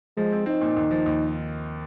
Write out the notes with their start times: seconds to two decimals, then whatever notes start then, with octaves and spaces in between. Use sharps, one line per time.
0.17 F3 G#3
0.32 C4
0.46 C4 D#4
0.61 A#2
0.76 D#2
0.91 F3
1.06 D#2